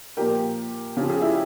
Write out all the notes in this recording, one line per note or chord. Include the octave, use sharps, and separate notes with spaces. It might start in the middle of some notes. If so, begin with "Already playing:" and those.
A#2 F3 G4 A#4
C#3 F3 G4
G#4
E4 G4